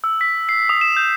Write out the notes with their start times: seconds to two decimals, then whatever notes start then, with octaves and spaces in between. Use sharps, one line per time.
0.04 E6
0.21 B6
0.49 C7
0.69 D#6
0.81 E7
0.97 G6